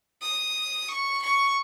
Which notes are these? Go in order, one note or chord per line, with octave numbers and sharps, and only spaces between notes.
D#6
C#6
C#6